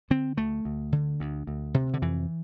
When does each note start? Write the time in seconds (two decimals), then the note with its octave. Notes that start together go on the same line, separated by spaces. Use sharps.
0.10 D3 C4
0.37 D2 A3
0.65 D2
0.92 D3
1.20 D2
1.47 D2
1.74 C3
1.94 D3
2.02 F2 E3